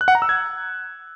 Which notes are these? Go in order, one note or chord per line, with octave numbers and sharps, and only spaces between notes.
F#6
F#5
A#5
E6
G#6